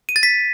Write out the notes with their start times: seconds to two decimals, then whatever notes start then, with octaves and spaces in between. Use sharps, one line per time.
0.09 D#7
0.16 A6
0.23 B6